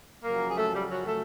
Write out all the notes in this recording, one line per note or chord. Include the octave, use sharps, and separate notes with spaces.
F#2 C#3 F3 A#3 A#4
G#4
A3 A4
G3 G4
F#3 F#4
A3 A4